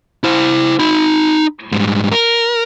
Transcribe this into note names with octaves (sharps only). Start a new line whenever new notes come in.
E4 C5
D#4 B5
G#2 G3
A#4